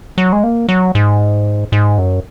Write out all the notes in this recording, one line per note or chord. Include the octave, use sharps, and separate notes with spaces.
F#3
G#3
A#3
F#3
G#2
G#2
F#2